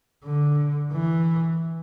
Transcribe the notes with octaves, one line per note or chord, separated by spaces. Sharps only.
D3
E3